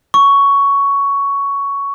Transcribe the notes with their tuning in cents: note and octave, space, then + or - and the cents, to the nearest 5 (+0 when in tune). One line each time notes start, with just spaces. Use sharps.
C#6 +10